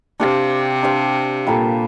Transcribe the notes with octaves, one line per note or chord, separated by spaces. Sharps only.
C3 D4 G4 C5 F5
D4 G4 C5 F5
A#2 G3 A#3 F4 A4